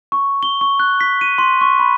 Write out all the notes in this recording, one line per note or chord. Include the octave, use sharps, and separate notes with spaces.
C#6
G7
C#6
F#6
B6
D#7
C6
C#6
B5